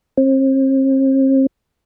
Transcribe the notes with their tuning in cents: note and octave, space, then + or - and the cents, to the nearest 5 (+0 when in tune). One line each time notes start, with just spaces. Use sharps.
C4 +40